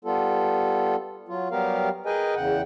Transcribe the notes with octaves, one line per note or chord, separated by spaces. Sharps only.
G3 B3 F4 A4
F#3 F4
F#3 G3 B3 G4 A#4 F5
G#4 A#4 B4 D#5 G5 G#5
E2 C#3 F#5 G5